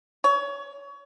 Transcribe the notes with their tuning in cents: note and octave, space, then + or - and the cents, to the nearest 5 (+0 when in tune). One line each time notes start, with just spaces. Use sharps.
C#5 +25